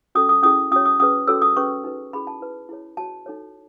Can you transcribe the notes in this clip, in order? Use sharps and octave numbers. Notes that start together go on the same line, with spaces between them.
C#4 F#4 A4 D#6
D#6
C#4 E4 G#4 D#6
C#4 F#4 C#5 D#6
D#6
C#4 G#4 B4 D#6
C#4 F#4 A4 C#5 E6
D#6
C#4 G#4 B4 C#6
D#4 F#4 B4
C#4 E4 G#4 B5
A5
E4 B4
E4 G#4 C#5
F#4 C#5 A5
D#4 A4 C#5